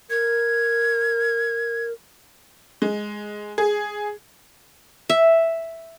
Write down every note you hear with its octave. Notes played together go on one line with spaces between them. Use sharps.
A#4 G#6
G#3
G#4
E5